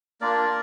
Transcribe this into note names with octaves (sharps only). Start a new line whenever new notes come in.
A#3 D4 F4 A#4 D5